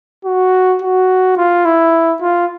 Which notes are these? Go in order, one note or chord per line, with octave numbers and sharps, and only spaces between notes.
F#4
F#4
F4
E4
F4